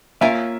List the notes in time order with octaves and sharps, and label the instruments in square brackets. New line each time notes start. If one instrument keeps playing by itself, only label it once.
[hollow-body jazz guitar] A#3 C#4 F4 A#4 [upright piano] E5